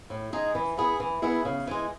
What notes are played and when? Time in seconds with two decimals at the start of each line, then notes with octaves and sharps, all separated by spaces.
0.10 A2
0.33 G#3 D#4 G#4
0.55 E3
0.77 B3 E4 G#4
1.00 E3
1.22 B3 E4 G#4
1.45 C#3
1.67 E3 G#3